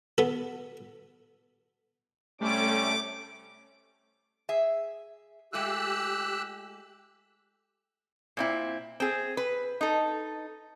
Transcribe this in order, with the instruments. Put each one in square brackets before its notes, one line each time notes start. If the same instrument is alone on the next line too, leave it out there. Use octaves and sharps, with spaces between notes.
[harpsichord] B3 A4
[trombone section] C3 G3 C#4 [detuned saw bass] A3 [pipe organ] D6
[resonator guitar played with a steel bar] G#4 E5
[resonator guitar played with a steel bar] G#3 A3 F4 [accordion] G4 E6 F#6
[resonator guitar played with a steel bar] A#2 C4 E4
C4 G#4
B4
D#4 A4